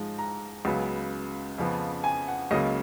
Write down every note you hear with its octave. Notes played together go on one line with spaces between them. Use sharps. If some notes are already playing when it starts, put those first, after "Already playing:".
Already playing: G#2 F3 G#3
A#5
C#2 C#3 F#3 B3
F2 C#3 F3 B3
G#5
F#5
C#2 C#3 F#3 A#3 C#4 D#5